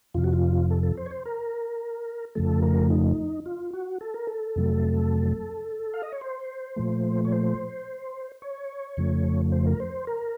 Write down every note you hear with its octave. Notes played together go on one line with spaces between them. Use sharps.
F2 C3 F3 F4
F#4
F4
A4
A4
C5
C#5
C5
A#4
F2 C#3 F3 A3 A4
A#4
D#4
F4
F#4
A4
A#4
A4
F2 C3 F#3 A3
F5
D#5
C#5
C5
A#2 F3 A3
C#5
C5
C#5
F2 C#3 F3 A3
C5
A#4
C5
A#4